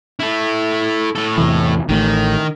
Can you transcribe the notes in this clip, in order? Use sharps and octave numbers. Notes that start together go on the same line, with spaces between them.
E4 A4
A2 A4
E2 C3 E3
A1 A2 D#3